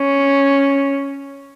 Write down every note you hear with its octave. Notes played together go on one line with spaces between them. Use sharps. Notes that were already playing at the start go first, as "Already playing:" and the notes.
Already playing: C#4